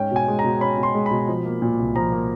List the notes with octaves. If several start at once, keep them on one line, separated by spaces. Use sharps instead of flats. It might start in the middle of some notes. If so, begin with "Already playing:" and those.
Already playing: G#2 C#4 G5
B2 G#5
G#3
A#5
B2
C#4 B5
B2
C6
G#3
B5
B2
F3
A#3
A#2
C2
F3 A#5
A#3